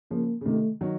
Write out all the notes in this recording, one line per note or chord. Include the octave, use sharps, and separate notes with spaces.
C#3 F3 A#3
C#3
C3 D#3 A3
D#3 F#3